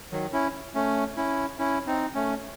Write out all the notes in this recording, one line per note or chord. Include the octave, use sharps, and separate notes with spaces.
D#3 F#3
C#4 E4
A3 C#4
C#4 E4
C#4 E4
C4 D#4
A3 C#4